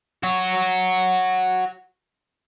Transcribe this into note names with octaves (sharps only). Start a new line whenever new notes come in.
F#4 C#5